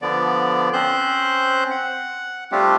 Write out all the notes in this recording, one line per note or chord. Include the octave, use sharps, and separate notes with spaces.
D3 F3 B3 D5
C4 C#4 C5 F#6 G6
F#5
G3 A3 C4 D4 F4 G4